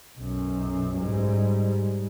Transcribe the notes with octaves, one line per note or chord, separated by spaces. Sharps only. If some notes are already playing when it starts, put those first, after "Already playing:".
B1 F#2
G#2 G3